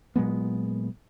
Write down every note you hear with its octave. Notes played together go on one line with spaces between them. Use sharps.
A#2 F#3 G#3 B3